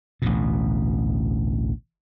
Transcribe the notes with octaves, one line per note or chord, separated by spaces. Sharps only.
A1 D2 B2